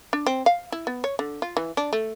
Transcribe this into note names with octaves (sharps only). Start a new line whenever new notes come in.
D4
C4
F5
E4
B3
C#5
D3
F4
E3
D4
A3